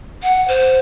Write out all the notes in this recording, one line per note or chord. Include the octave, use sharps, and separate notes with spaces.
F#5
C5